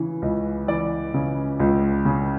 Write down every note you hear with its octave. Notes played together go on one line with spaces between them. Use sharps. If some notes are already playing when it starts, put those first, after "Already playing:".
Already playing: C#3 E3
C#2
E3 D5
C#3
C#2
C#3